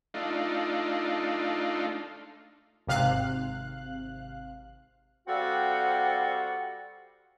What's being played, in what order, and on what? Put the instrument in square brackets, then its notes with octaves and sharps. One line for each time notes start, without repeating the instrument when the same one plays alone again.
[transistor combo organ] A3 D4 D#4 F4
[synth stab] G#1 C3 F5 F#6
[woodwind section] G3 C4 F#4 A4 F5 F#5